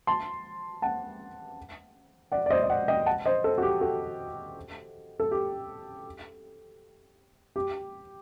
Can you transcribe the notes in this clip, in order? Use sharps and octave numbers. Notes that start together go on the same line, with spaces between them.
A5 C6
F#5 A5
D5 F#5
D5
C5 D#5
D#5
D5 F#5
D#5 G5
F#5 A5
C5 D#5
A4 C5
F#4
G4
F#4 A4
A4
G4
G4